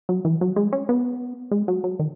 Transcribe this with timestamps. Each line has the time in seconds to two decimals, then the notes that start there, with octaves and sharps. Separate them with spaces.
0.09 F#3
0.25 E3
0.41 F#3
0.56 G#3
0.73 C#4
0.89 B3
1.51 G#3
1.68 F#3
1.84 F#3
1.99 D#3